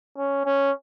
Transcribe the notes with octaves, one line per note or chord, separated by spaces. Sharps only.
C#4
C#4